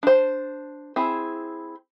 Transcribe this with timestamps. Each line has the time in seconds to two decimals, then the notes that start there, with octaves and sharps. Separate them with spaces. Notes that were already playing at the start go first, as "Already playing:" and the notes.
0.03 D4 C5
0.96 C4 E4 G#4